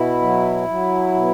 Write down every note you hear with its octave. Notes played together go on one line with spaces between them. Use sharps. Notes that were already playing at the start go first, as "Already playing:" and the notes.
Already playing: B2 E4
F#3
F#3
B2